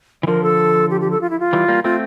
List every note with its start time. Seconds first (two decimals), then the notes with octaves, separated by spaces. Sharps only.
0.23 E3
0.27 D3 F3 A#4
0.43 A4
0.90 G4
1.01 G4
1.11 A4
1.21 F4
1.30 E4
1.40 F4
1.53 E3 G3
1.68 G3 A#3
1.84 A3 C4 F4